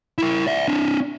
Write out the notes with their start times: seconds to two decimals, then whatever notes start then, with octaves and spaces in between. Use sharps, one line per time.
0.18 E4 A#4
0.47 D5 E5
0.68 C4 D4